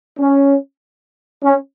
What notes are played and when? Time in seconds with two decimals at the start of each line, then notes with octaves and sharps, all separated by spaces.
0.18 C#4
1.44 C#4